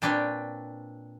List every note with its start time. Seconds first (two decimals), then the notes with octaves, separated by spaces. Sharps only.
0.02 A#2 C4 D4 B4 C#5 G5